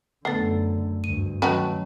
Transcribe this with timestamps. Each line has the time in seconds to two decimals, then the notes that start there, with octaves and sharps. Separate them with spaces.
0.25 F#2 D3 A3 B3 A4 A6
1.04 D2 G2 D#7
1.42 D#3 F#3 C#4 F#4 B4 G5 A5